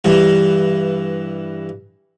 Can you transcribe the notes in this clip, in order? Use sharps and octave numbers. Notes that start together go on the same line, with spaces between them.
G2 E3